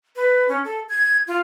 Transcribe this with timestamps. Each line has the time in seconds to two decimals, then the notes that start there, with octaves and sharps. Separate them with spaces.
0.16 B4
0.48 C#4
0.64 A4
0.89 G#6
1.27 F4